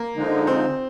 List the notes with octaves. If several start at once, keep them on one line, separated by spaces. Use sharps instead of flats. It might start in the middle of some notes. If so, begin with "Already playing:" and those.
Already playing: A#3
D3 F3 G#3 D#4
C4